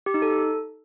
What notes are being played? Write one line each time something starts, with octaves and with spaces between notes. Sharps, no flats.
G4
D#4
A4